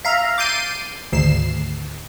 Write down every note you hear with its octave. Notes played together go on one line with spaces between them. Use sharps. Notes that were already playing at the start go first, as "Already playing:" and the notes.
E5 F5 A#5
D6 G6 A6 C7 D#7
G#1 D2 C7 E7